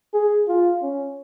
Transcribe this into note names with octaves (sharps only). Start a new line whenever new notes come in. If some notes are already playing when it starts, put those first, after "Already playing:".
G#4
F4
C#4